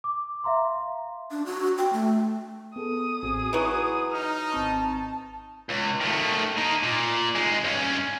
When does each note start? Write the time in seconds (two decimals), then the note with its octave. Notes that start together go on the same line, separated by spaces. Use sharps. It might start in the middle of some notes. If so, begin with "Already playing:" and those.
0.04 D6
0.44 E5 F5 A#5 C6
1.31 D4
1.46 F#4
1.78 G5
1.93 A3
2.76 B3 G#4 A4 D#6
3.23 A1 C4 F#4 G#4
3.53 E3 F#3 E4 F#4
4.13 D#4 F6
4.52 G#1 C4 A5 C#6
5.70 C#2
6.01 D#3 A3
6.57 A#3 D#4
6.83 A#2
7.36 D#3 G#3
7.64 G2 C#4